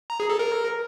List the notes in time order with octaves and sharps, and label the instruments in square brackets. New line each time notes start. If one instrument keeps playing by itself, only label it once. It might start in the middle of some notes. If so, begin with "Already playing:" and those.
[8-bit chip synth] A#5
G#4
A4
A#4